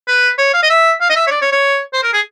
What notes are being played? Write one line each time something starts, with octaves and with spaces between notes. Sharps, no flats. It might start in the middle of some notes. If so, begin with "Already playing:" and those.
B4
C#5
F5
D#5
E5
F5
D#5
E5
C#5
D5
C#5
C#5
C5
A#4
G#4